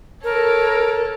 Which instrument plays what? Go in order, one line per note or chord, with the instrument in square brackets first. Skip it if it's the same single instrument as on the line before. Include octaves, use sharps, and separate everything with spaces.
[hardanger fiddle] A4 C#5 [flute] A#4